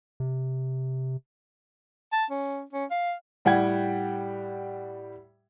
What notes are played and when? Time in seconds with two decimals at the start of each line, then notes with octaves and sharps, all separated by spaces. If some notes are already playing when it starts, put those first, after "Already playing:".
0.20 C3
2.12 A5
2.30 C#4
2.73 C#4
2.91 F5
3.45 A2 G3 F#5 G5 G#6